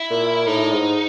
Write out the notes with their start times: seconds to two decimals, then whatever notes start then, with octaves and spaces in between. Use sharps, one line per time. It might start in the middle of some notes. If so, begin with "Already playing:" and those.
Already playing: E4
0.10 A#2
0.47 A2 D#4
0.72 G#2